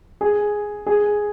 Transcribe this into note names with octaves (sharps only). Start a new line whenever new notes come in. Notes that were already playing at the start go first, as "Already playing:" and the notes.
G#4
G#4